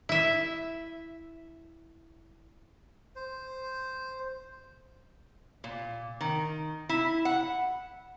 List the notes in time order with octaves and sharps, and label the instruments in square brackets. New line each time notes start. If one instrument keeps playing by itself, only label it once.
[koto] E4 E5
[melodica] C5
[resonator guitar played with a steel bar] A#2
D#3
E4
F#5